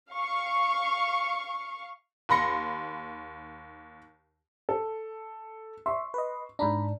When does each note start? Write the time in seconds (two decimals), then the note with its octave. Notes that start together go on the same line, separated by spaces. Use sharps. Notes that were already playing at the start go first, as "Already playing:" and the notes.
0.12 F5 C#6
2.29 D#2 B5 C6 A#6 C#7
4.69 A4
5.86 E5 C6 C#6
6.14 B4 D#5
6.59 G#2 D4 A#5 B5